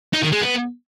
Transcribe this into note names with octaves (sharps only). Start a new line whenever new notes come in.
D#4
D#3
G#3
B3